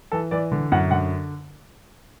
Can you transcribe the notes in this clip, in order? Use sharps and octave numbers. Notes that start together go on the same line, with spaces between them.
E3 A4
E3 D5
D3
F#2 F#5
D3 F#5